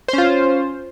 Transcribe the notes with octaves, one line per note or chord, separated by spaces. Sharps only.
C#4 F4 C5